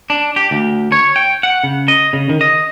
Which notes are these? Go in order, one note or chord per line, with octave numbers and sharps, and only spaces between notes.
D4
G4
D2
C#5
G5
F#5
C#3
D#5
C#3
D#3
D#5